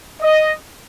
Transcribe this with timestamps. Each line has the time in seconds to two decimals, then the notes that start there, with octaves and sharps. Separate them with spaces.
0.22 D#5